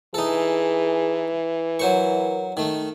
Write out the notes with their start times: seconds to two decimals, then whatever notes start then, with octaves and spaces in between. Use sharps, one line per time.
0.14 E3 D#4 G#4 A4
1.79 F#3 A#4 C5 C#6
2.57 D#3 A3 D#4